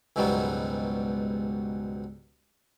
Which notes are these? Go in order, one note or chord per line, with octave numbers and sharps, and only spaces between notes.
C#2 G#2 B2 F#3 G3 B3